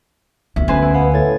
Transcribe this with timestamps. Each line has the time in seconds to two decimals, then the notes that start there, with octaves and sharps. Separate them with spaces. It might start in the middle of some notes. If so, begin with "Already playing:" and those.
0.56 D2 B3 E5
0.68 D2 C#4 B4 C5 G#5
0.82 E4
0.94 B3 B4 F5 G#5
1.14 A2 G#6 A6